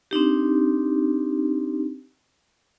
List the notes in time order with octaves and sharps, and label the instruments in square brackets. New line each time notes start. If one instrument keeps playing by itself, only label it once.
[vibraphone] C4 D4 D#4 G4